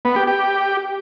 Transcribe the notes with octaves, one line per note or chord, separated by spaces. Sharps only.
B3
G4
G4